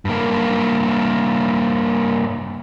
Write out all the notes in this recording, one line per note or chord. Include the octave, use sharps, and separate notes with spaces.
G2 A#3